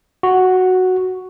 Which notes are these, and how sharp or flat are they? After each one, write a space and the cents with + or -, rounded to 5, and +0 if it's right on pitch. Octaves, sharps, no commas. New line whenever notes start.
F#4 +0